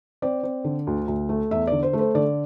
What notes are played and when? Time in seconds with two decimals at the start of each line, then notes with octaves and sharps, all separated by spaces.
0.22 C4 D5
0.43 C4
0.64 D3
0.87 D2
1.08 D2
1.29 A3
1.51 E2 E5
1.67 D3 D5
1.83 C5
1.93 A3
1.99 C5
2.15 D3 D5